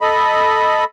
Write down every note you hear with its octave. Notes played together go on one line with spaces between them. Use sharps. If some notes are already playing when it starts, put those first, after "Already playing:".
A4 D#5 B5